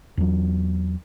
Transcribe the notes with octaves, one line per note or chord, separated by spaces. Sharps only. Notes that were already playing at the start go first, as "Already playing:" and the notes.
E2 F#3